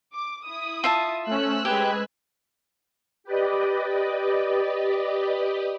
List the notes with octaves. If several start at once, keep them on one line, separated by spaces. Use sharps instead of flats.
D6
E4 D#6
F4 E5 A5
A3 C#4 C5 E6 F#6
G#3 G4 B4 G#6
G4 B4 D5 D#5